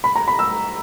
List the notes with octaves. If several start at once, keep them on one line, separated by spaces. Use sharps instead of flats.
B5
A#5
B5
E6